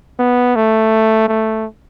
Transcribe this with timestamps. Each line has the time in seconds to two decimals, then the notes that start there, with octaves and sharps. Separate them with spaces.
0.19 B3
0.56 A3
1.28 A3